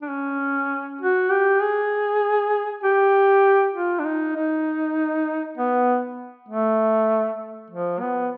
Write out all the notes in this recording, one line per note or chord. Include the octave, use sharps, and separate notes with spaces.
D4
C#4
F#4
G4
G#4
G4
F4
D4
D#4
D#4
B3
A3
F3
B3